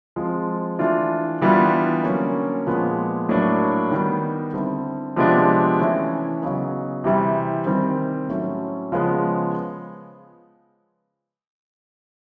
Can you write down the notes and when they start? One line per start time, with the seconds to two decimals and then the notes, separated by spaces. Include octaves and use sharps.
0.16 F3 G#3 C4 F4
0.79 E3 A3 D4 F4
1.42 E3 G3 B3 D4 F4
2.03 D3 F#3 A#3 C#4
2.67 A#2 F3 G#3 B3
3.29 A2 F#3 A#3 D4
3.91 D#3 G3 B3
4.54 D3 G3 C4 E4
5.16 C3 F3 G#3 B3 D4
5.80 E3 A3 C#4 E4
6.42 C#3 F#3 B3 D#4
7.04 C3 E3 G3
7.66 D#3 G3 C4
8.28 A2 F#3 A3 C#4
8.92 C#3 F3 G#3 B3